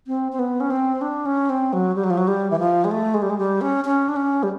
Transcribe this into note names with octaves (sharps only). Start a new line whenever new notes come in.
C4
C4
B3
C#4
C4
D4
C#4
C4
F#3
G3
F#3
F3
F#3
G3
E3
F3
G#3
A3
G#3
G3
G#3
G3
C#4
C#4
D4
C#4
G3